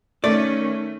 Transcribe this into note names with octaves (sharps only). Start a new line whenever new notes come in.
D#3 A3 C#4 D5